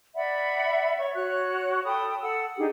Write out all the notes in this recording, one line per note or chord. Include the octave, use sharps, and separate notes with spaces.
D5 E5 F#5 B5
C#5 C#6
F#4 C#5 F#6
A4 G5 B5 D#6
A4 F#5 E6
D4 D#4 G4 G#4